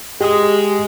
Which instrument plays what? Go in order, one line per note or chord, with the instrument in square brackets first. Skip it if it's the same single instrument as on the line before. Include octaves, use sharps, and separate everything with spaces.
[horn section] G#3 [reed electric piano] G4 D#6